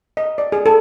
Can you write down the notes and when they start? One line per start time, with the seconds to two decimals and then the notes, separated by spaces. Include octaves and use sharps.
0.17 D#5
0.38 D5
0.52 G#4
0.66 A4